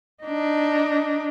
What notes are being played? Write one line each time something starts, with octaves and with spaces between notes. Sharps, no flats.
D4 D#4